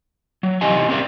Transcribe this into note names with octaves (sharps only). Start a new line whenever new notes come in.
F#3
C3 E3 D#4 G4 D#5 G#5
C4 C#4 G4 A#4 D5 E5